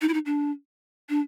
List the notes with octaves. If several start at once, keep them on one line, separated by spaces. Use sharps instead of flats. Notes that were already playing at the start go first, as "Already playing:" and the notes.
D#4
E4
D#4
D4
D4